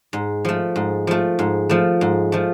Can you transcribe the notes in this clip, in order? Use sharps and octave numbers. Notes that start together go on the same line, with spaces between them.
G#2
F3 A3
G#2
F3 A3
G#2
F3 A3
G#2
F3 A3